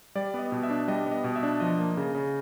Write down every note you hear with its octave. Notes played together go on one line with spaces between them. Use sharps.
G3 D5
B3 D#5
B2
E5
D4
G3 D#5
B3
D#5
B2
E5
D4
F3 D#5
A#3
C#3
C#3